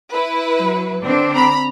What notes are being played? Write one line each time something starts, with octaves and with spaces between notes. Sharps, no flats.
E4 B4
F#3
D3 C4 D4
A#5 B5